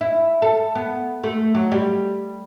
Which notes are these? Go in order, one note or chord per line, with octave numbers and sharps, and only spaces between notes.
E4
A4
B3
A3
F#3
G3